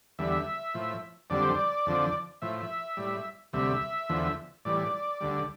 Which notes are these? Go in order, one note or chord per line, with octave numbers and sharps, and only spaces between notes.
E2 D3 G3 E5
A2 F3
F2 D3 G3 D5
C5
D5
F2 D3 F3
A2 F3 E5
E5
A2 G3
D2 C3 G3 E5
E2 D3 F3
A2 E3 G3 D5
D2 D3 G3